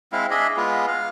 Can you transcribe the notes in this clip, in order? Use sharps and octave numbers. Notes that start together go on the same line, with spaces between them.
G#3 C4 E4 F5
D4 G#4 D#5 E5
G#3 B3 F4
F5